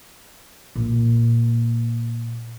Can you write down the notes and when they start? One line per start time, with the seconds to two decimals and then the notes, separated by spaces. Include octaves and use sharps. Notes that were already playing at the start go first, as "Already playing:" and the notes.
0.76 A#2 A#3